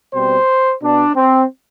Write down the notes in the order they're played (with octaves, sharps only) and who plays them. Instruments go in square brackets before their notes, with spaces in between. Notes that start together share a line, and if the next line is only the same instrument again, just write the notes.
[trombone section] B2 G3 C4 C5
B2 B3 D4
C4